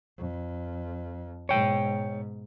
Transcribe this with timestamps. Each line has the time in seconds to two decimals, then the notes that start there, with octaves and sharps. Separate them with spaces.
0.18 F2
1.49 G#2 B2 C#5 G5